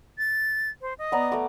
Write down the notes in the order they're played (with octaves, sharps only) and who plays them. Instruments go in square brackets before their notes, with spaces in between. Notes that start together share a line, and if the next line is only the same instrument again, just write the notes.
[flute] A6
C5
D#5
[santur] B3 D5 A#5
A3 D6